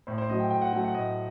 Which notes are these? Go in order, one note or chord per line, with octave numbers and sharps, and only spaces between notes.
A2 C5
C5
F#3 A3 D#5
G5
A2 G5
F#5
F#3 A3 G5
F#5
A2 D#5